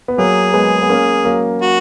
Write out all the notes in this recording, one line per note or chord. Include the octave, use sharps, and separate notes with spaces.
B3
F#3 A#3 G#4
G#3 B3
B3
A#3 C#4
F#3 A#3
F#4